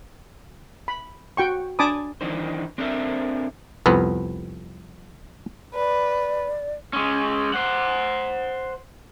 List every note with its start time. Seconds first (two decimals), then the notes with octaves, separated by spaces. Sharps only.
0.88 B5
1.37 F#4 G5 C#6
1.79 D4 G#5 A5 B5 D6 D#6
2.21 D#3 E3 D4 D#4 C5
2.78 C4 D4 A4 A#4 C5 E5
3.86 C2 F2 B3 B4
5.74 B4 D5
6.93 G#3 C#4
7.54 C5 F#5